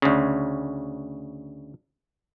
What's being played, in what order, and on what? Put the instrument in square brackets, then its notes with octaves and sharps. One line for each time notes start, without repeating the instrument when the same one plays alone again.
[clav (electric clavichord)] D2 C#3